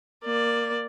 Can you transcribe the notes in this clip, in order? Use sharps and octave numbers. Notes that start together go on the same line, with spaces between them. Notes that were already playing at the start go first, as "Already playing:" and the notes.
A#3 D5